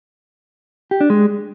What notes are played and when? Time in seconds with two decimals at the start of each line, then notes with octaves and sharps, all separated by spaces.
0.91 G4
1.01 D4
1.10 G#3